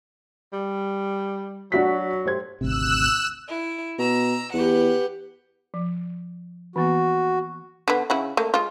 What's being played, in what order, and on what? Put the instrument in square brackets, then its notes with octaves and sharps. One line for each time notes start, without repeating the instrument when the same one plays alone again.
[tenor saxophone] G3
[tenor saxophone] F#3 [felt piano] D4 F#4 B6
[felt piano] G4 C5 G#6
[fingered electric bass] G#1 D2 C3 [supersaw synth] E6 F#6 E7
[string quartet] E4
[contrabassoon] B2 [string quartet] A#5 E6
[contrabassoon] E2 [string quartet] G4 B4 F#5
[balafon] F3
[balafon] E3 A#3 B3 [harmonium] F#4
[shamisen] D3 B3
C#3 E4 F#5
A3 A#3
G#3 F4